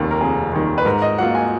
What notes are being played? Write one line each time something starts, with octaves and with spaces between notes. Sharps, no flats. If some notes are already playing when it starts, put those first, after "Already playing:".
Already playing: F1 D#2 D#3
A#4
F1 G#4
D#2 D#3
B4
G#2 A#4
D#5
F#3 A#3 F4 F#5
G#5